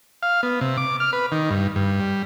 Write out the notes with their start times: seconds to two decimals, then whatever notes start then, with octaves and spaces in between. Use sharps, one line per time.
0.23 F5
0.43 B3
0.61 C3
0.77 D6
1.00 F6
1.13 B4
1.32 D#3
1.50 G2
1.76 G2
2.00 G3